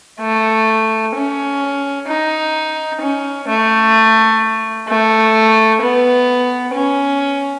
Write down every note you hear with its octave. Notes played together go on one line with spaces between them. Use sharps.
A3
C#4
D#4
C#4
A3
A3
B3
C#4